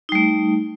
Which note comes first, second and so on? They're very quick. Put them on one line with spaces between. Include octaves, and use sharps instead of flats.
D#4 G3 A3